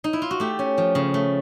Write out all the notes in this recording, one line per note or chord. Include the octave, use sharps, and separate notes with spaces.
D#4
E4
F4
F#4
A3 G4
C#4
F3
C#3
A3